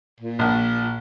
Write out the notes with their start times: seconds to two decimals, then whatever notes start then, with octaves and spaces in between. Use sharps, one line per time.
0.20 A#2
0.39 A#1